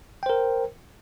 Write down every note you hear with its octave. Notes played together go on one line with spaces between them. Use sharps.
A#4 C5 G5